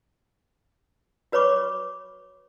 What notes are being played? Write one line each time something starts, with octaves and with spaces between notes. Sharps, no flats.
F#4 B4 C#5 B5 C#6 D6